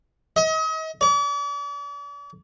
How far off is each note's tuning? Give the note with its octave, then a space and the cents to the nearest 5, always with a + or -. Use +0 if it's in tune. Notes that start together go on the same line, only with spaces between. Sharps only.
D#5 +40
D5 -45